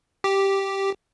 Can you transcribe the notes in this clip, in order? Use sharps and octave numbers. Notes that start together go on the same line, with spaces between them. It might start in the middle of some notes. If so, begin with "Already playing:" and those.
G4